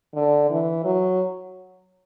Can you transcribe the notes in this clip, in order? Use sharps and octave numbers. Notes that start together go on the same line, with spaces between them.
D3
E3
F#3